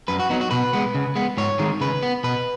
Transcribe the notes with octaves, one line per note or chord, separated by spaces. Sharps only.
F#2 B4
F#4
F#3 B3 D#4
F#4
B2 B4
G#3 B3
C#3
G#3 B3
G#2 C#5
D#3 G#3
C#3 B4
B3
B2 B4